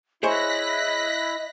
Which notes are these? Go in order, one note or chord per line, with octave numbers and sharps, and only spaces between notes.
E4 G#4 C5 C#5 D#5 F#6 A#6 B6